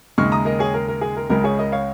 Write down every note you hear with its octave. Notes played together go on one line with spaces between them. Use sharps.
D#2 C#3 G#3 C#6 F6
A#5 D#6
A#4 D#5
G#4 C#5
A#4
A#4
G#4
A#4
C#2 C#3 G#3 A#4
G#4 C#5
A#4 D#5
C#5 F5